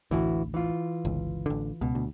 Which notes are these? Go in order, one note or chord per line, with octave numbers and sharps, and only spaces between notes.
A1 D2 E3 E4 F#4
E3 F4
G1 C#2
A1 D3
C#2 B2
D2